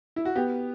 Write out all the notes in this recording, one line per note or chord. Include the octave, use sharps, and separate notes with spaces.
E4
F#4
B3 G4